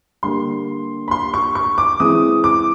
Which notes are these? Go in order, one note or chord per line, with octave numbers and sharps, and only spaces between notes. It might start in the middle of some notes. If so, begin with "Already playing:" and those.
D3 G3 A#3 C6
B5
C6
C#6
C#6
D6
E3 G#3 C4 D#6
D6